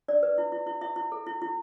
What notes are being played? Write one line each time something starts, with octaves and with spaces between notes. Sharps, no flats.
D4 D5
B4
E4
E4
E4
E4 E5
E4
A4
E4
E4